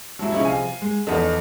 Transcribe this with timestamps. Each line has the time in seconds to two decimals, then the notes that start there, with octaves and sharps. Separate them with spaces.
0.19 C3 F#3 G#3 E4 A5
0.32 C3 F3 C#4 D#4 E4 G#4
0.45 F5 G#5
0.82 G#3
1.07 E2 F3 B3 D#4 F4 A4